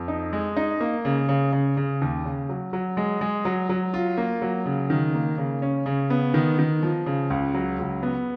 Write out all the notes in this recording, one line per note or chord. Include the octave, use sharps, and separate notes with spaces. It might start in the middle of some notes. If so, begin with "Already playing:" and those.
Already playing: F2
D#4
G#3
D#4
A#3
C#3
C#3
C#3
C#3
D#2
C#3
F#3
F#3
G#3
G#3
F#3
F#3
F4
A#3
F#3
C#3
D#3
A#3
C#3
C#4
C#3
B3
D#3
D#3
F3
C#3
C#2
F#3
C#2
B3